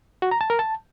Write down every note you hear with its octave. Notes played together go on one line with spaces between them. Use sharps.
F#4
A#5
A5
A#4
A5